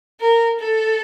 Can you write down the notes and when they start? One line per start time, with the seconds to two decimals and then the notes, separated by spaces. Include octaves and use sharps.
0.20 A#4
0.59 A4